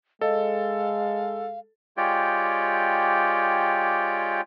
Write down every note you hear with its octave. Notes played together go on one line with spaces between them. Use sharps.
G#3 A4 D#5 F5
G#3 F4 G4 C#5 D5 G5